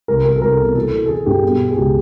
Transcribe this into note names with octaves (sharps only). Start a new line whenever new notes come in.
C2 A#4
C2 A#4
A4
C2 A#4
B2 A4
E3 A4
E3
A4
E3 G#4
G2 G4
B2
B2
G#4
C#2 G4